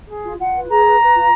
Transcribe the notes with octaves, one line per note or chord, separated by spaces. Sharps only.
G#4
F4
F4 F#5
B4
G#4 A#5
B4
B4
F4